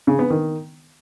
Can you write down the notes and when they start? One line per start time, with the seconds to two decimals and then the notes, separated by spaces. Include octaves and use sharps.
0.07 C#3
0.19 B3
0.30 D#3